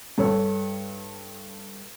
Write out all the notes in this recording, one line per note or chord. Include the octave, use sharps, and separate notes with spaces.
G2 A4 C#5 E6